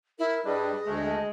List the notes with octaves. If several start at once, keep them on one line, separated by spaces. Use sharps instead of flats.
E4 A#4
G2 G3 D4 G#4 B4 D#5
D2 G#3 A3